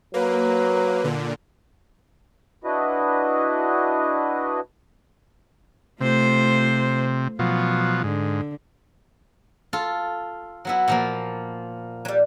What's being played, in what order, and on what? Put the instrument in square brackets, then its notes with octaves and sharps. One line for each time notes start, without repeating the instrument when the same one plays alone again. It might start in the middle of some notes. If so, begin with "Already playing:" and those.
[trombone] F#3 [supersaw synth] A#3 [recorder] B4
[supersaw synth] A#2 D3
[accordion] D4 E4 F#4 B4 D#5
[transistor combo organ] C3 [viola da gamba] A3 F4 C5
[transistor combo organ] B2 F3 F#3 [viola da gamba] F4
[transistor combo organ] G#2 [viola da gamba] D3
[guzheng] F4 A4
F#3 B3 E4
A#2 F3 A#3
[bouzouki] F#3 G3